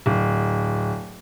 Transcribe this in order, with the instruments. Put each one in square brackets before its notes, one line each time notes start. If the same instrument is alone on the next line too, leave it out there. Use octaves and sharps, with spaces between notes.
[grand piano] D1